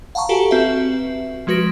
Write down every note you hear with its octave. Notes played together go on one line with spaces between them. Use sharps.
F5 F#5 A5 A#5 C#6
F#4 G4 A4 G#5
C4 F#4 B4 E5
F3 G#3 F#4 B4 A#6 D7